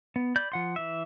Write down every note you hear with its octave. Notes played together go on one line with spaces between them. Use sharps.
B3
D5 B5 G6
F3 F#5 C6
E3 E5